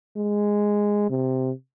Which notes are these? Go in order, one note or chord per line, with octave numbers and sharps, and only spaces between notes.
G#3
C3